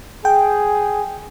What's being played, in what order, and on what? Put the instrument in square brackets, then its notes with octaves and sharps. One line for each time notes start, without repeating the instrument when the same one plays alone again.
[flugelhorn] G#4 [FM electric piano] G5